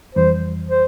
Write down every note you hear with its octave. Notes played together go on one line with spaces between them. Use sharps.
F2 E3 G3 C5
C5